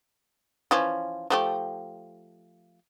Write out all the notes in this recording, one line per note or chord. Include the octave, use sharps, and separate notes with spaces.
E3 F3 C#4
F3 A3 G4